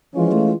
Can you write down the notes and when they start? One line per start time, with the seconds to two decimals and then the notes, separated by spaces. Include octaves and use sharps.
0.14 E3 F3 G#3 C#4 F4
0.32 A3